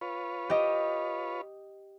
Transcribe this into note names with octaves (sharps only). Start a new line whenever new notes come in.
F4 B4 C#5
G4 D#5